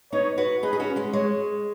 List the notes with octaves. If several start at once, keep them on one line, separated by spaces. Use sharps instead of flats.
B3 D#4 C#5
F#4 B4
D#4 G#4 B4
G#4
C#4 F#4
G#3 C#4
G#3 C#5